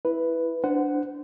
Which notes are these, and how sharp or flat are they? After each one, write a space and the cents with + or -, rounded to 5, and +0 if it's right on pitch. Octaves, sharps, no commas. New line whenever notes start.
E4 +0 B4 +0
D4 +0 C5 -25 F#5 +0